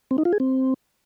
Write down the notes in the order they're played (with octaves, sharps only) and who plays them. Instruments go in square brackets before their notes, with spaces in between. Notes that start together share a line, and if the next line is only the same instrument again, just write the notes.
[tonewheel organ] C4
D#4
F4
G#4
C4